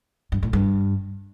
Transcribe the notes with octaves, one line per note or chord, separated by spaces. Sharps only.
G2
A2
G2